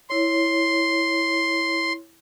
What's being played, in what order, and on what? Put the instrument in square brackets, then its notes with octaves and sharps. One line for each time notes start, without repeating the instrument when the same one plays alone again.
[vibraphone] E4 C#5 [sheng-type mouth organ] C6